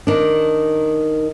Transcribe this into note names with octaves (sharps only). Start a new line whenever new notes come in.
D#3 D4